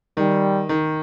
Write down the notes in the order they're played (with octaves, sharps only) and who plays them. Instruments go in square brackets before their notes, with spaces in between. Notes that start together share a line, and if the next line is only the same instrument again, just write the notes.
[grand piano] D#3 [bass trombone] G3
[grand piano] D#3